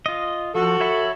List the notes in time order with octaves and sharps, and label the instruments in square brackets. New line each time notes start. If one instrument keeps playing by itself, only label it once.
[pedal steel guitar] F4 D#5
[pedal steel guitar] F3 [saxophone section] F#4 A4
[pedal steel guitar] C#5 E5 B5